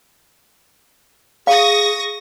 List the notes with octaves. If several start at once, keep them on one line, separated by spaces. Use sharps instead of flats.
G#4 F5 C#6 D#6 A#6